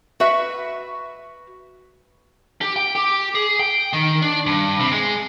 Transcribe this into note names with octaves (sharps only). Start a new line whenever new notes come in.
F#4 B4 E5
G4
G5
G4
G#4
G5
D#3
D4
G2
C3
G#3